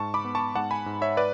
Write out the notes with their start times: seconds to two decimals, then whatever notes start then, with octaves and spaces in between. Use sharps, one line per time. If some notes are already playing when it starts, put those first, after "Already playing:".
Already playing: G#2 A5 C#6
0.14 B5 D6
0.25 B3
0.35 A5 C#6
0.56 G#2 F#5 A5
0.71 G#5 B5
0.86 G#2
1.01 C#5 E5
1.17 B4 D5